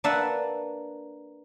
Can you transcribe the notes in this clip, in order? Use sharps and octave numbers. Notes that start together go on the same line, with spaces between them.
A#3 D4 B4 D5 E5 F#5